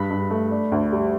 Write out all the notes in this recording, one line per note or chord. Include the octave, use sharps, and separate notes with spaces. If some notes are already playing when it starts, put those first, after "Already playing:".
Already playing: G2 B5 B6
G2
A3
D4
D2
G3